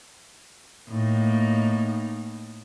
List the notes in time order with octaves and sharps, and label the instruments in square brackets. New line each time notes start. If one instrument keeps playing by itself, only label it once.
[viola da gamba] A2 A#3 D#4